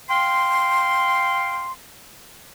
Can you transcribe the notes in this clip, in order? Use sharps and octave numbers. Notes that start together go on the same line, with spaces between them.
F5 G5 C6